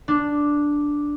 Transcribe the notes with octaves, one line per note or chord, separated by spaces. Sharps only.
D4